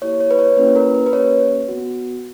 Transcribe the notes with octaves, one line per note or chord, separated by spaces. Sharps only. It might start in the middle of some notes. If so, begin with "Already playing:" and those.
A#3 E4 G4 C#5
C#5
B4
C#5
A#3 C#4 E4 G4 B4
A#4
B4
B4
A#3 C#4 G4 C#5
B3 F#4